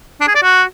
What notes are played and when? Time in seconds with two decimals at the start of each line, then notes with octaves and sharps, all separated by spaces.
0.20 D4
0.28 G#4
0.35 D5
0.43 F#4